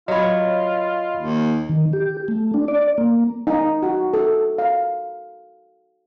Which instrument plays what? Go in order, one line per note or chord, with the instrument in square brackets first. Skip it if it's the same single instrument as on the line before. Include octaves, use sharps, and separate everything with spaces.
[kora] F#3 C#5 [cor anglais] F4 [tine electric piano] D#5 B5
[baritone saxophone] D#2
[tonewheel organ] D#3
G4
A3
D4
D5
A#3
[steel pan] D#4
F#4
A4
F5